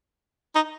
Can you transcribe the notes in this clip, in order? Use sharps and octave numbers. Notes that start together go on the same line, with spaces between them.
D#4